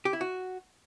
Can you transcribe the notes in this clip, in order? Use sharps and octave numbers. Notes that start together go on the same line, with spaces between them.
G4
E4
F#4